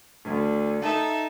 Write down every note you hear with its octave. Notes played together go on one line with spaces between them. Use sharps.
D2
D#4 A4 E5